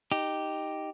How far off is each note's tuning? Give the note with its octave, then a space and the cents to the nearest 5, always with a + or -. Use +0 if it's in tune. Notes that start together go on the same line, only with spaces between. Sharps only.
D#4 +0 G4 +0